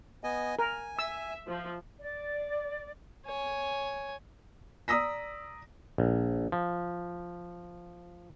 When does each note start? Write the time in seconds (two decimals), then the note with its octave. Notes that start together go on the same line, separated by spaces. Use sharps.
0.24 B3 D#5 G#5
0.59 A#4 G#5
0.99 E5 E6
1.48 F3
2.00 D5
3.26 C#5 G#5
4.88 D5 A#5 D#6 E6 A#6 B6
5.98 A#1
6.52 F3